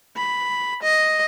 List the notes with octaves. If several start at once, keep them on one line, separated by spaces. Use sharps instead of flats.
B5
D#5